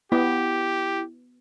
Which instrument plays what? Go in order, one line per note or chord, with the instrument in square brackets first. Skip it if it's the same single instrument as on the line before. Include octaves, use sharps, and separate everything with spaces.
[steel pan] B3 [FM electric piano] E4 [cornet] G4